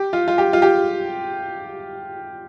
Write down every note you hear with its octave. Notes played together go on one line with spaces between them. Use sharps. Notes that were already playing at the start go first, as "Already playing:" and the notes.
Already playing: G4
F4
F4
G4
F4
G4